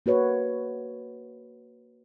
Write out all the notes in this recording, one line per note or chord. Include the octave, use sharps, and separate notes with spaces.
A#3 F#4 B4 C#5